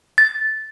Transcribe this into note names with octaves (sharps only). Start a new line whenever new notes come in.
A6